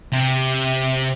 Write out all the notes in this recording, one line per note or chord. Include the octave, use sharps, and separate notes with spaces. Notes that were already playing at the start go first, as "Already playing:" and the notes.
C3